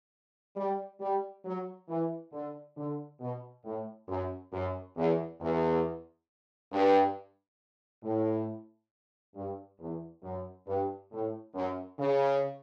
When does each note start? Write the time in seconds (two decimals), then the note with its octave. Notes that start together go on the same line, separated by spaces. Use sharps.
0.57 G3
1.00 G3
1.45 F#3
1.88 E3
2.33 D3
2.77 D3
3.20 B2
3.65 A2
4.08 F#2
4.53 F#2
4.97 E2
5.40 E2
6.72 G2
8.03 A2
9.35 G2
9.80 E2
10.23 F#2
10.67 G2
11.11 A2
11.54 F#2
11.99 C#3